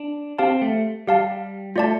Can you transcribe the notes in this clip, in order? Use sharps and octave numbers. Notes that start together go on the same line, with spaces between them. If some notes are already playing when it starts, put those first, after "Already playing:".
Already playing: D4
C4 G4 F5 A5
A3
G3 G4 F5 A5
A3 F4 D5 A5